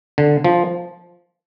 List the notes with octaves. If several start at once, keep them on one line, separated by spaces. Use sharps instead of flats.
D3
F3